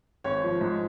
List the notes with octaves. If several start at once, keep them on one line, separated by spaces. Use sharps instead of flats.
G#1 C#5
F3
G#2